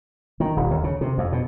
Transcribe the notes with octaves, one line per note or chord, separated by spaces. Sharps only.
D#3
D#1
D#2
C#3
C3
F2
B2